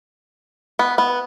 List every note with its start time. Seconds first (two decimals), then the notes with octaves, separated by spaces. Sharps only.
0.79 B3
0.98 B3